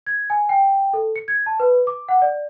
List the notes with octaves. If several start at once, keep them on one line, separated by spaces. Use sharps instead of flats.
G#6
G#5
G5
A4
C#7
G#6
A5
B4
D6
F#5
D5